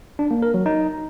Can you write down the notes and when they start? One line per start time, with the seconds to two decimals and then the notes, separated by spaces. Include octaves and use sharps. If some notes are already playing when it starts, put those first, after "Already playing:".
0.19 D4
0.31 A#3
0.42 A#4
0.54 F#3
0.66 D#4